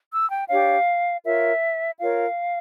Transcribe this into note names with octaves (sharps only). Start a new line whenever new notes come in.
E6
G5
D4 G4 C#5 F5
F4 A#4 C#5 E5
F4 A#4 C#5 F5